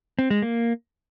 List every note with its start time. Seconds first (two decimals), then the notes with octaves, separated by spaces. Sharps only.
0.19 C4
0.30 G#3
0.42 A#3